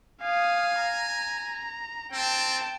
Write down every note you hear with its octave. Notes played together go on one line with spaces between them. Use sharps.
F5 G#5 D#6
A#5
C4 G5 A5